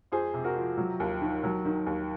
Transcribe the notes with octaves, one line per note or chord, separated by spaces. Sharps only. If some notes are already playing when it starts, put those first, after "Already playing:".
F2 G#4 C5
C3
F#4 A#4
F3
F#3
D#2
D#3
F#3
D#3
D#2